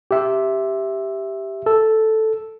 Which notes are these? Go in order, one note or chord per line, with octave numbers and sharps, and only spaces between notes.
G4 E5
A4